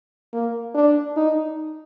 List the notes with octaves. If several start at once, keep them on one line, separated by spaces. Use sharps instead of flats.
A#3
D4
D#4